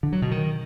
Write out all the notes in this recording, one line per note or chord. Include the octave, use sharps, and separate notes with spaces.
D3
F#3
B2
D#3